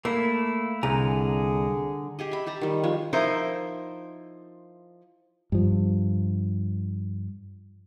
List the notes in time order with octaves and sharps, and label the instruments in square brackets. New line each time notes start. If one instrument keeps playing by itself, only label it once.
[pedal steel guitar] A3 E4 [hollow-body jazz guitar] A#3
[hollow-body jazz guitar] C2 [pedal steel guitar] D3 G#5 A#5 [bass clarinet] G#4
[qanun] G4 G#4 D#5
E5 B5
G4 A5 A#5
D#3 G3
F3 G#3 C#5
[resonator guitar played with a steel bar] F3 D#4 E4 A#4 C5
[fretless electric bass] G2 F3